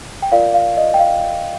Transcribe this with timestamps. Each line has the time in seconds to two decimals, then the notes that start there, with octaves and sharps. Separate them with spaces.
0.22 G5
0.32 F4 A#4 D5 F5
0.54 F5
0.77 D#5
0.94 G5
0.99 F5